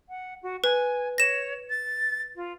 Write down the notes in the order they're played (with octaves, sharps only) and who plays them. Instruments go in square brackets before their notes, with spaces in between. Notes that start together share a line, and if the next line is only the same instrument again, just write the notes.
[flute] F#5
F#4
[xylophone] B4 [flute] G#5
[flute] C#5 [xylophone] A#6 E7
[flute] A6
F4